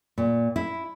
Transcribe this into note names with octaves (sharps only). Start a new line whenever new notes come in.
A#2
E4